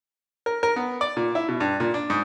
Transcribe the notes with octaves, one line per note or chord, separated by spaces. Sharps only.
A#4
A#4
B3
D5
A#2
E4
B2
G2
A#2
D4
G#2